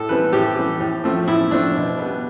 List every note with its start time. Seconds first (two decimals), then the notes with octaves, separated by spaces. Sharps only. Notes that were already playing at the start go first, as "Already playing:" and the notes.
Already playing: A2 A4
0.09 E3 G3 C4 B4
0.33 A2 G4
0.56 E3 G3 C4
0.80 A2
1.04 F3 A3 C4
1.28 A2 E4
1.51 F3 A3 C4 D4
1.75 B2
1.98 G3 B3